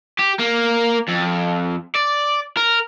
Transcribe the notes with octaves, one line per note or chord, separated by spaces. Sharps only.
G4
A#3
F2
D5
A#4